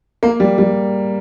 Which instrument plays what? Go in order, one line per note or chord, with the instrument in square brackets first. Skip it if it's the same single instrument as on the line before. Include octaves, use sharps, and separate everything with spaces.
[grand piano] A#3
G3
G3